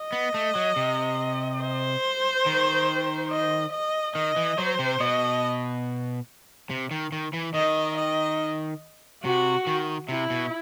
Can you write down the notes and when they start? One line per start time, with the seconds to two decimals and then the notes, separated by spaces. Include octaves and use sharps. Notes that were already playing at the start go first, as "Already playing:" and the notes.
Already playing: D#5
0.12 B3
0.34 A3
0.55 F#3
0.76 C3
1.62 C5
2.46 D#3
3.31 D#5
3.73 D#5
4.15 D#3 D#5
4.36 E3
4.58 F#3 C5
4.79 C3
5.00 B2 D#5
6.70 C3
6.91 D#3
7.12 D#3
7.33 E3
7.54 D#3 D#5
7.97 D#5
9.24 C3 F#4
9.67 D#3
10.09 C3 E4
10.30 B2